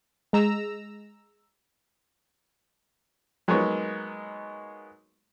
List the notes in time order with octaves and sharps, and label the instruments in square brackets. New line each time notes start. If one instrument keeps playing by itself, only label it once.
[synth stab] G#3 A#5 E6
[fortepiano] F#3 G#3 A#3 B3 D#4 C#5